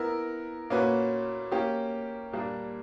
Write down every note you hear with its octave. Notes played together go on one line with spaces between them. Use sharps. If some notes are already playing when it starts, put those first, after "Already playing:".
Already playing: B3 E4 A#4
A#2 A#3 C#4 F#4 B4
A#3 C#4 G4
A#2 G3 A#3 D4